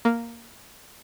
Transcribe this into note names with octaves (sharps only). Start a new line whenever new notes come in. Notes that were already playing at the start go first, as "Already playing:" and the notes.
A#3